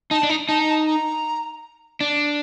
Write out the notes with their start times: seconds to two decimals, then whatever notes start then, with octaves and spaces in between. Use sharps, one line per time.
0.11 D#4 A5
0.23 D4
0.29 D#4
0.48 D#4 A5
0.60 A#5
0.70 A5
0.87 A#5
2.01 D4